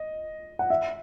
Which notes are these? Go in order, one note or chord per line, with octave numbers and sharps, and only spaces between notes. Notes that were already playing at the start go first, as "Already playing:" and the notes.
Already playing: D#5
F#5
E5